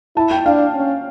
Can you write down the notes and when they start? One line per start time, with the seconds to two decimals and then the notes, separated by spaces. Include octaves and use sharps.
0.17 E4 A5
0.31 G5
0.45 D4 F5
0.74 C#4